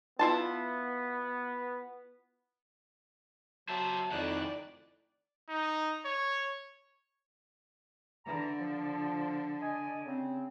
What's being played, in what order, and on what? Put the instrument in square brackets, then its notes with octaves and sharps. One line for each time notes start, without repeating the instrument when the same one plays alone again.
[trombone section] B3 [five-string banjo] E4 F4 A5
[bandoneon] F#3 A5 [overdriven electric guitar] C5 E5
[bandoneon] F2 F#6 [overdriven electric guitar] A2 D#3 [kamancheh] D5
[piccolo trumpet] D#4
C#5
[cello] D3 [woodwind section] E3 A#5
[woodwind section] F3
D#5 G#5
C#3 C4